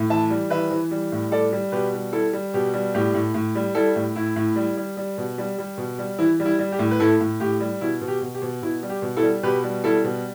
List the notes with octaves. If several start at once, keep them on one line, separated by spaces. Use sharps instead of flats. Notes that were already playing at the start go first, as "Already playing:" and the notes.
Already playing: A2
E3 E5 A5
G3
E3 B4 E5
E3
G3
A2
G3 A4 D5
G3
B2 G4 B4
G3
G3 E4 A4
G3
B2 G4
G3
A2 G4
A2
A2
G3
G3 E4 A4
A2
A2 E4
A2
G3
G3
G3
B2
G3
G3
B2
G3
E3 E4
G3
E4
G3
G4
A2
B4
A2 E4 A4
A2
A2 G4
G3
B2 E4
B2
G4
B2
G4
B2
B2 E4
G3
G4
B2
E4 A4
G3
B2 G4 B4
G3
G3 E4 A4
B2